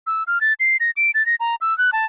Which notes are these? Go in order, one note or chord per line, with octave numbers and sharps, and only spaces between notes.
E6
F6
A6
C7
A#6
D7
A6
A#6
A#5
E6
F#6
A5